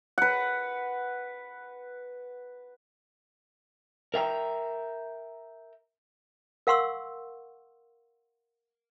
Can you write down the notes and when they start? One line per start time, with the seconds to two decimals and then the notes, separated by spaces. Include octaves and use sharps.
0.18 B4 F#5
4.14 A#4 E5 G5 A#5
6.67 A#4 F5 F#5 C6 C#6 E6